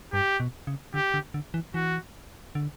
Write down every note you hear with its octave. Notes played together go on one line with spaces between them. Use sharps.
G2 G4
B2
C#3
D3 G4
D3
D3
E3
E3 F#4
D3